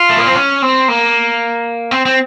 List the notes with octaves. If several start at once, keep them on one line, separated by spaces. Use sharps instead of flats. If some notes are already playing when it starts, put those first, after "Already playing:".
Already playing: F4
A3
A#3
C4
C#4
C4
A#3
C4
C4